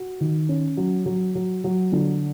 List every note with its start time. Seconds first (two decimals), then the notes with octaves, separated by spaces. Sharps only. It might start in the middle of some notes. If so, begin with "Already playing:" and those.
Already playing: F#4
0.20 D#3
0.49 C#4
0.77 F#3
1.06 F#3
1.35 F#3
1.64 F#3
1.92 D3